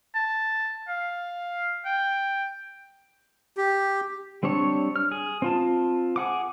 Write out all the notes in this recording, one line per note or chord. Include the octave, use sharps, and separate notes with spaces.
A5
F5
G5
G4
G3 C4 D4 C#5
F6
G#4
C4 F4 A5
G#4 F#5 D6